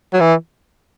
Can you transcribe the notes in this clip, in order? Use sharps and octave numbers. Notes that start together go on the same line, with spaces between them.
F#3
E3